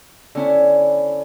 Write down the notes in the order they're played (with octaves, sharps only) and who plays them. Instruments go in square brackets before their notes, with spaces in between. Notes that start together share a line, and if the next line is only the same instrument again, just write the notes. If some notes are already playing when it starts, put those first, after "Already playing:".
[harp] D3 C#4 E4